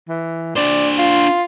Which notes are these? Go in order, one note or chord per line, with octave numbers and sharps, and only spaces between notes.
E3
D4 C5 D5
F4